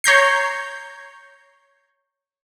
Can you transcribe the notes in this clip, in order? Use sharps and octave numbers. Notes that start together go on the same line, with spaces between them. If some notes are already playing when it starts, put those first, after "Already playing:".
C#5 A#5 G6 C7